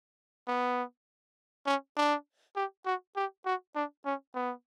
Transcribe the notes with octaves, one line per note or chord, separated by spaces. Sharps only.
B3
C#4
D4
G4
F#4
G4
F#4
D4
C#4
B3